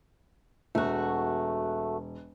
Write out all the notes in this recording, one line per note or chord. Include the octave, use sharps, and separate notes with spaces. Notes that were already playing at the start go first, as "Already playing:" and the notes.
E1 A3 F#4